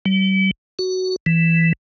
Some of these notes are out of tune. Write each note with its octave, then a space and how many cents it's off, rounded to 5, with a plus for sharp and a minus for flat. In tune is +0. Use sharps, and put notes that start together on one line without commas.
G3 -40
F#4 +10
E3 +5